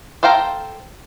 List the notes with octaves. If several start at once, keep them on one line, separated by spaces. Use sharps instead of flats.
A4 C5 F5 G5 A#5